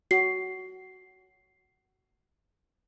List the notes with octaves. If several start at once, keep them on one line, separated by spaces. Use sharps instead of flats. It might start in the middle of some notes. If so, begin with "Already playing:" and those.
F#4 C7